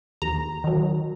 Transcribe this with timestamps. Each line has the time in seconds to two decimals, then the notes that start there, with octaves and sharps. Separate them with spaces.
0.22 D#2 A#5
0.64 D#3 F#3